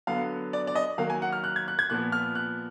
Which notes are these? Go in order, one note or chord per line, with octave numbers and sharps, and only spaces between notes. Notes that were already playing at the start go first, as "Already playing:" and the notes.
D3 F#3 B3 F5
D5
D5
D#5
D#3 F#3 A#3 F5
G#5
F#5
F6
F#6
G#6
F#6
G#6
A#2 F3 B3 F#6
F6
F#6